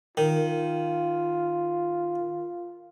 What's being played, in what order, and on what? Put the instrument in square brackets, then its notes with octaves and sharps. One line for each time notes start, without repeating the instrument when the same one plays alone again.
[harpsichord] D#3 [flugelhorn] F4